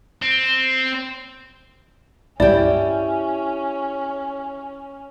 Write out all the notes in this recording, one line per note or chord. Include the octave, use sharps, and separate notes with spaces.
C4
C#2 G2 C#4 E4 G4 D5 D7